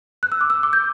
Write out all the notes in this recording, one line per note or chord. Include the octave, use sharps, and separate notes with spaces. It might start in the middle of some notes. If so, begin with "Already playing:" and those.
F#6
E6
D6
E6
D6
G6